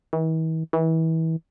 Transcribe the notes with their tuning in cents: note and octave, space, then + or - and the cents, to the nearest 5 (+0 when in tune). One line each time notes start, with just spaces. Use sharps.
E3 -45
E3 -30